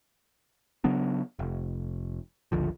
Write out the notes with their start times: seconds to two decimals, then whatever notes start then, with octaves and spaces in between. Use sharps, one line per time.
0.84 C#3 F#3 B3 D4
1.39 F1
2.52 G1 C#2 D3 F3